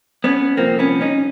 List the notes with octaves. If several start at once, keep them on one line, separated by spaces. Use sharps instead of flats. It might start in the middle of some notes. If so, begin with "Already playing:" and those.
B3 C#4
C2 A#2 F3 A#3 C4
B3 C#4
C#4 D#4